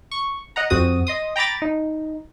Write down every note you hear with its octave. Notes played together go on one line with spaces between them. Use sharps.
C#6
D#5 F#5 A#5
F2 C4 F#4 D#6
D#5 C6 D#6
G5 A#5 B5 D6 A6
D#4